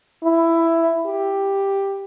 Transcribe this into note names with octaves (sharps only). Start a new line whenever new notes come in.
E4
G4